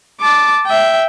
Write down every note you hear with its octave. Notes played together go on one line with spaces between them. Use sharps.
A5 D6
E5 G5